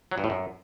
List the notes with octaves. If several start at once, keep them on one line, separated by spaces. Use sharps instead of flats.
F#3
G2
A2
F#2